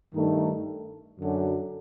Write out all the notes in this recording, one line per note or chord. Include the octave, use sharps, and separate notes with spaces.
G2 D#3 A3 D#4
F#2 D3 F#3